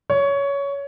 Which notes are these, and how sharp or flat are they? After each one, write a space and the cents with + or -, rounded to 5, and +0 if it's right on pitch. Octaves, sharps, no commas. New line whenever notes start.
C#5 +15